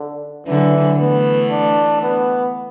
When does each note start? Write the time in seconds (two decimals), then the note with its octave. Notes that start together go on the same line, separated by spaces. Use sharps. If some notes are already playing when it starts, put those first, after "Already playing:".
Already playing: D3
0.47 D3 E3 F#3
0.99 E3 A3 B3
1.51 D4
2.02 B3